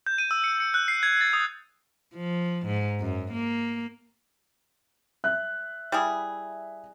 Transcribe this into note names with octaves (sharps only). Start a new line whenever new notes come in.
G6
D#7
E6
C#7
C#7
F#6
C7
G#6
A6
D#6
F3
G#2
F#2
A#3
E5 F#6
G3 E4 G#4